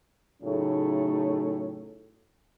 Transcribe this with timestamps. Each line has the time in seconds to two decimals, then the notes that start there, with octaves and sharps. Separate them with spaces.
0.43 A2 C#3 F#3 A3 C#4 D#4